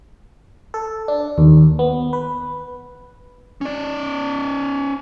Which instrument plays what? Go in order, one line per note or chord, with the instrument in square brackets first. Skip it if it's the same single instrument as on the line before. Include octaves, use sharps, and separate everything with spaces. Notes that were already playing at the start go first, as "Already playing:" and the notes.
[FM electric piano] A4
D4
D#2
B3
B4
[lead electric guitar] C#4 D5